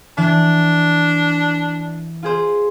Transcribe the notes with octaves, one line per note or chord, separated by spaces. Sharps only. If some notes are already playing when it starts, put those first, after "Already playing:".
E3 D4
F4 G#4 C5